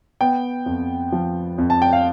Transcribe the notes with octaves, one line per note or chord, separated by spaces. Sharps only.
B3 G5
F2
F3
F2
A5
G5
F5